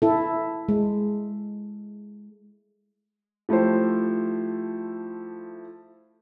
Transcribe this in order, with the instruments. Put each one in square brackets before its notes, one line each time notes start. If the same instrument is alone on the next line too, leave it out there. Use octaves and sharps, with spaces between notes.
[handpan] E4 A4
G#3
[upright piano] F3 A3 E4 G4 C5